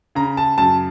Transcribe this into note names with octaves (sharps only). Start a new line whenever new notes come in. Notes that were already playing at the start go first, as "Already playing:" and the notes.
C#3 A#5
A5
F#2 A5